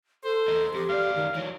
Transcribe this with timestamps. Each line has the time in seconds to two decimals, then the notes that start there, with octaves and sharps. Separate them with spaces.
0.24 A4 C5
0.48 E2 D#4
0.74 F2 G4
0.89 F#2 D5 F5
1.16 D#3
1.35 E3 F#3 C#5